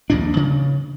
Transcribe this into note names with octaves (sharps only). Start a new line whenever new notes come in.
A#1 D#2 G#2 D4
C#3